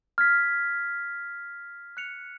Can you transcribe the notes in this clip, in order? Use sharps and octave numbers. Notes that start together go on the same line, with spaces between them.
F6 G#6 B6
F#6 C#7 F7